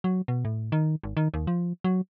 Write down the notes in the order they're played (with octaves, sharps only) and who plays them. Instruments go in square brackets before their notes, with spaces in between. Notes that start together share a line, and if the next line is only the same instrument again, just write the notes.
[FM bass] F#3
B2
A2
D#3
G#1
D#3
D#2
F3
F#3